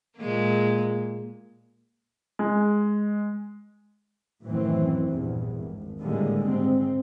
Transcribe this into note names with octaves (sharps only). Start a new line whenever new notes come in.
A#2 G#3 A#3
G#3
A1 F#2 D#3 E3 C4
A#1 E2 G2
G#1
A2 D3 D#3 G3 G#3 A#3
G#2 C4